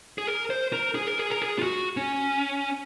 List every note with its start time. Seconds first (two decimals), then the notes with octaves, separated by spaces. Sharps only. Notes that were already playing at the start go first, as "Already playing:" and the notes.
0.18 G#4
0.27 A#4
0.50 C5
0.73 A#4
0.95 G#4
1.07 A#4
1.19 G#4
1.30 A#4
1.42 G#4
1.59 F4
1.63 F#4
1.97 C#4